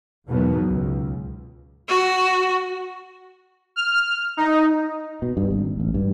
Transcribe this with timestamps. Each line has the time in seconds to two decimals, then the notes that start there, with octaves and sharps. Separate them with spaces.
0.28 E2 G#2 B2 D#3 F#3 B3
0.67 C#2
1.88 F#4
3.76 F6
4.37 D#4
5.22 B2
5.37 G2
5.50 G#1
5.80 A1
5.94 G2